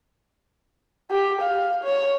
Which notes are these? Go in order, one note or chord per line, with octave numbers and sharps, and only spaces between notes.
G4
F5
C#5